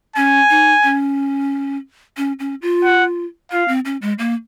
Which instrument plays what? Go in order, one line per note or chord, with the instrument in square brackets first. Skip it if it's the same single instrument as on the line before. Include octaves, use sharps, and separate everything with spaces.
[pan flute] C#4 [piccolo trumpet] G#5
[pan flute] D#4
C#4
C#4
C#4
F4
[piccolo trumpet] F#5
[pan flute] F4 [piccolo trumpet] F5
[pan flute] C4
C#4
G#3
A#3